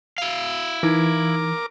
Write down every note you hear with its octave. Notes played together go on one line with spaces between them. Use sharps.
E4 F5 F7
E3 D#4 A#4 D6 G#6